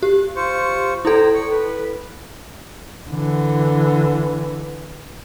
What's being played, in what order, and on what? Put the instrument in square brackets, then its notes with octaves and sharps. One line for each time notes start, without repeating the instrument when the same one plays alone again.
[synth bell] G4 [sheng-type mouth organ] F#6
[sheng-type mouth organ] F4 C5 C#6
[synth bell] E4 A4 [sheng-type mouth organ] C5 A#5
[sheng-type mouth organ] C#6
B4
[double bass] D3 E3